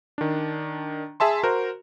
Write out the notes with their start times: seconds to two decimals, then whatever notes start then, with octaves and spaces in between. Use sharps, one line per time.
0.18 D#3 D4
1.20 G#4 E5 A5 C6
1.43 F#4 A#4 C5